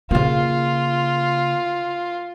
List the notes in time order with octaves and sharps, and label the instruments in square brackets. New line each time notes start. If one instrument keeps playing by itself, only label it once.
[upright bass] C#3 A#3 [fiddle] F4